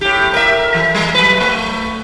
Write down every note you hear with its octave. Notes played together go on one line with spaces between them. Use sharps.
A2 G4
A#4 E5
E3
G3
F#3 B4
A3